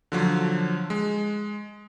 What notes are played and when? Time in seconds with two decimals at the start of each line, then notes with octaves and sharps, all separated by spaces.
0.12 D3 F3 F#3
0.90 G#3